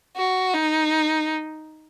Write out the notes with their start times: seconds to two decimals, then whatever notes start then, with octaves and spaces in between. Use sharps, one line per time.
0.17 F#4
0.54 D#4